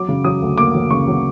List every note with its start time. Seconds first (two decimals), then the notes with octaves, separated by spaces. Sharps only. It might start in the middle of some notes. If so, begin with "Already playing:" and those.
Already playing: F#3 D6
0.08 C#3
0.24 F#3 D#6
0.42 D2
0.58 A#3 D6
0.75 F#3
0.91 C#3 C#6
1.07 F#3